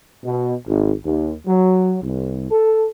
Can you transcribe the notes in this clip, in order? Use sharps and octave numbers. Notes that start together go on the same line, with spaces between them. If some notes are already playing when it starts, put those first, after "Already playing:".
B2
G#1
D#2
F#3
C2
A4